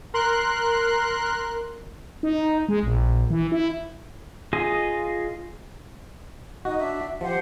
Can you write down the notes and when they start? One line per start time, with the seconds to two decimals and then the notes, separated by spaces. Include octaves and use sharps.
0.14 A#4 C6 F#6
2.23 D#4
2.69 G#3
2.83 A#1
3.30 E3
3.52 E4
4.53 F4 G#4 D#5
6.65 D#4 F#4 D#5
6.80 D4 E5
7.21 F3 G4 C5 F#5